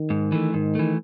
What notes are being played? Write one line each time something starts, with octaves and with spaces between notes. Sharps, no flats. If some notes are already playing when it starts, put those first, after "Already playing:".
Already playing: D#3
G#2
E3 A3
G#2 D#3
E3 A3